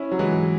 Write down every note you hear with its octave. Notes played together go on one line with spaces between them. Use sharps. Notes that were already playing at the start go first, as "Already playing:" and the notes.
Already playing: C#4 E4
F#3
E3 G#3